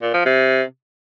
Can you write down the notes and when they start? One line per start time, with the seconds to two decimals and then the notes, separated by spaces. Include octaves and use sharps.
0.02 A#2
0.14 F3
0.25 C3